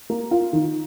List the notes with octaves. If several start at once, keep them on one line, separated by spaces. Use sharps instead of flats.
A#3
F4
D#3